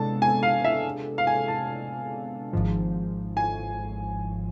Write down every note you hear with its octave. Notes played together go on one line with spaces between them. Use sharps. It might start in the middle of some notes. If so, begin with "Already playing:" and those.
Already playing: C3 G#3 B3 D4 A4 A5
G#5
F5
E5
F5
G#5
A5
G#1 G#2 F3
G#5